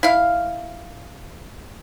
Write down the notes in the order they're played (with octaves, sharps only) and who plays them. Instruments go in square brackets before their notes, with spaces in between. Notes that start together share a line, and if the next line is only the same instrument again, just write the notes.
[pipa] E4 F5